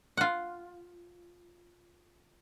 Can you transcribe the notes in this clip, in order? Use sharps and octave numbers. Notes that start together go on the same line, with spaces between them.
F4 F#5